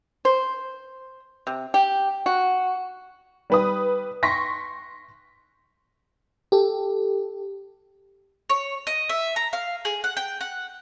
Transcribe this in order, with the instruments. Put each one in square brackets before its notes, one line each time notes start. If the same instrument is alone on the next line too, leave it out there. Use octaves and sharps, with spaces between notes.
[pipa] C5
C3
G4
F#4
[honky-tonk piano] G3 B4 D#6
C6 C#6 A#6 B6
[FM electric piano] G4 A4
[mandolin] C#5
D#5
E5
A#5
F5
G#4
F#5
G5
F#5